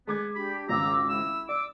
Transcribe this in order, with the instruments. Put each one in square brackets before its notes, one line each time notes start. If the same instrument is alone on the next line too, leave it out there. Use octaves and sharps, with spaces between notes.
[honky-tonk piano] G#3 D6 G#6 [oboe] B3
[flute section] D4 G4 [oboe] B5
[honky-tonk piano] G#1 C#2 [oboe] A#5 [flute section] D6 E6
[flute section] E4 [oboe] E6
[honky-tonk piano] D5 [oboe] D6 [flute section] E6